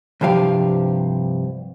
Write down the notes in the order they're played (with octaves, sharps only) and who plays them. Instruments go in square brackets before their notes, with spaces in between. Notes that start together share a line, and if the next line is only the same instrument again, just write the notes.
[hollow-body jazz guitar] C2 G2 F3 G4 F5